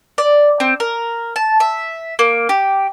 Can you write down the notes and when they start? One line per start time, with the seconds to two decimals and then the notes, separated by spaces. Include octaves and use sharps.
0.18 D5
0.60 C4
0.80 A#4
1.36 A5
1.60 E5
2.19 A#3
2.49 G4